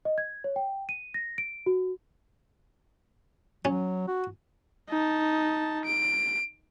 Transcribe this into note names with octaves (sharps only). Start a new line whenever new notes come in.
D#5
G#6
C#5
G5
D#7
A#6
D7
F#4
F#3 C#4
F#4
D#4 A5
D7